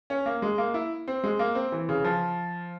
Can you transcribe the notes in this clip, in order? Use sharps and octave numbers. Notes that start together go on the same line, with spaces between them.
C#4
A#3
G#3
A#3
E4
C4
G#3
A#3
C4
E3
C#3
F3